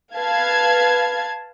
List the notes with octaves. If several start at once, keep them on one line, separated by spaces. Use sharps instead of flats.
B4 F5 A5 G#6